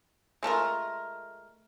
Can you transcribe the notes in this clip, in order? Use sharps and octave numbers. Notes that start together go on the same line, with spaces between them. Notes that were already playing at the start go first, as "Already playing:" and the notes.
G#3 A3 F4 A#4